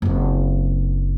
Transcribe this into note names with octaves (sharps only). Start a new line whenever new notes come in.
F#1 C4